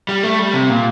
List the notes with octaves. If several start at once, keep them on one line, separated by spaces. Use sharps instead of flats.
G3
A3
G3
C3
A#2